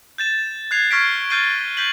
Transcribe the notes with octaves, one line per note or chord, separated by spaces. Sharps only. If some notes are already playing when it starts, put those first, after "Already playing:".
G6 A6 E7
F#6 G#6 C7 F7
C#6 F6 G#6 B6 C7 D7
F6 G6 A6 C7 D#7 G7
G6 B6 D#7 F#7